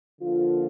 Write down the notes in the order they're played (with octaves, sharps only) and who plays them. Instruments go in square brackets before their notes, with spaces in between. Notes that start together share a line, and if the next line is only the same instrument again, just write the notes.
[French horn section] D3 F3 A#3 F4